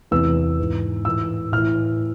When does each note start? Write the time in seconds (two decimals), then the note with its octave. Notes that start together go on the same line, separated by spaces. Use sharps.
0.11 E2 C3 E3 E6
0.59 G#2 E3
1.05 A2 E3 E6
1.52 A2 E3 F6